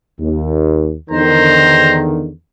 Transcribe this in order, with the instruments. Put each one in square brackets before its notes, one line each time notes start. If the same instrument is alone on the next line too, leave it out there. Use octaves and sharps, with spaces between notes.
[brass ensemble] D#2
[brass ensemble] E2 D3 D#3 [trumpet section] C5 A#5